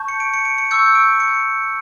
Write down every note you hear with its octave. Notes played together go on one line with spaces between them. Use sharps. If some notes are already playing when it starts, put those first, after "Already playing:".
Already playing: A5 C#6 G6
C#7
D7
C#7
D7
C#7
C#6 E6 G6 C#7
D7
C#7